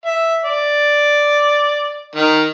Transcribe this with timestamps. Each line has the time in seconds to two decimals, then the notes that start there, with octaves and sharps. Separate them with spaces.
0.06 E5
0.45 D5
2.16 D#3